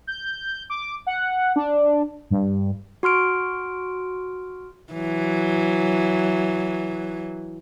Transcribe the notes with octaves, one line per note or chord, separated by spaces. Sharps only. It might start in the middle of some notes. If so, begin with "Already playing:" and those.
G6
D6
F#5
D4
G2
F#4 C6 F6 D7
E3 F#3